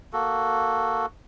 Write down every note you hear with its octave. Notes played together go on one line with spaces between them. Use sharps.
A#3 F#4 A4